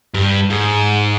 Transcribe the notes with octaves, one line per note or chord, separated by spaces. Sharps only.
G2
G#2